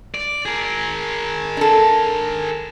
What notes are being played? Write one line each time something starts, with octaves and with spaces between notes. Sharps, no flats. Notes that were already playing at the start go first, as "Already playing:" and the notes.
D5
G#4 A#4
D4 A4